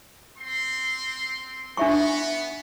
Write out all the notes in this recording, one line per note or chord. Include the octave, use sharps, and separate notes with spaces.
C4 C6
B3 D4 E5 C#6